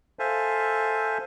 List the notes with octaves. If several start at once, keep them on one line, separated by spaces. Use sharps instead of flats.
A4 C5 E5 F5 G#5